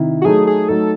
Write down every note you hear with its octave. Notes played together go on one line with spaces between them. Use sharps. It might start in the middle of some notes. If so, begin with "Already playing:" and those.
Already playing: C3 D#3 E4
F#4
F#3 A3 D#4 G#4
G#4
F#3 A3 D#4 A4